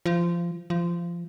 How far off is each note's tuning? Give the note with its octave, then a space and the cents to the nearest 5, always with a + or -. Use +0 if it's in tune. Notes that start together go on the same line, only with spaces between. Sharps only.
F3 -20
F3 -20